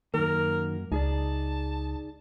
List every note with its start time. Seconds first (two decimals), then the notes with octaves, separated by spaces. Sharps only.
0.14 F#2 D#3 A#3 A#4
0.92 C#2 D#4 G#4 D5 A5